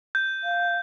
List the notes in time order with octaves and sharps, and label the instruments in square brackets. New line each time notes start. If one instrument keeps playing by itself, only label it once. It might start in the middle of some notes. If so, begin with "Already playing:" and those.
[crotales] G6
[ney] F5